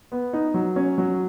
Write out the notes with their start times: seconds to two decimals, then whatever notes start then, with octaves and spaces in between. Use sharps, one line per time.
0.12 B3
0.33 D#4
0.54 F#3
0.76 C#4
0.98 F#3